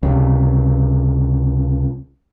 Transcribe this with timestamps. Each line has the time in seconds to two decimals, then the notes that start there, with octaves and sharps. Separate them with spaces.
0.03 C#2 C3